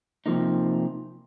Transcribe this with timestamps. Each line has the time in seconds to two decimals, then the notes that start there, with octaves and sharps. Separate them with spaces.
0.26 C3 F3 A#3 D#4